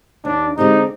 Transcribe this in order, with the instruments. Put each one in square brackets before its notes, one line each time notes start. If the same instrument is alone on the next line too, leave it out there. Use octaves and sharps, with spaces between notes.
[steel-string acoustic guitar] D#2 [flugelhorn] D4
[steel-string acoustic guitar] D3 G#3 C4 G4 [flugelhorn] D#4